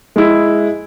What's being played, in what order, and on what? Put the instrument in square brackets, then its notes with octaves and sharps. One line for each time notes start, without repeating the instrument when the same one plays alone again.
[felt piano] G#3 E4